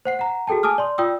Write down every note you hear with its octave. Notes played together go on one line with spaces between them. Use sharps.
C5 F#5 C7
F#5 A#5
F#4 G#4 A4 G5 A5
G#5 A5 D6 D#6 F6
D5 C6
F4 D5 G5 D#6 E6